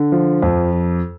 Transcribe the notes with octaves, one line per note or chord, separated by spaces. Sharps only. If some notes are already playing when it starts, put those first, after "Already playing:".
Already playing: D3
F3
F2